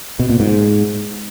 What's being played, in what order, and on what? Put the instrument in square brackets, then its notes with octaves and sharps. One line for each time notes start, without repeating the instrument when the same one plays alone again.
[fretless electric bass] B2
A#2
G#2